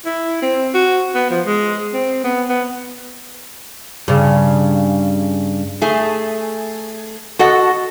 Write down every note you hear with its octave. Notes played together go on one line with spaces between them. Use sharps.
E4
C4
F#4
B3
F3
G#3
C4
B3
B3
G2 C#3
A3 G#4
F#4 A4 D#5 F#5